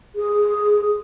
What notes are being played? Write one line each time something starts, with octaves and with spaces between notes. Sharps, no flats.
G#4